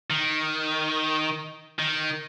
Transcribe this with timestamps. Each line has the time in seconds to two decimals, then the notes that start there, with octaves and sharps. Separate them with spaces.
0.10 D#3
1.79 D#3